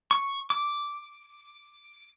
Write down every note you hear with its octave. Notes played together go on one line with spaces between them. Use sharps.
C#6
D6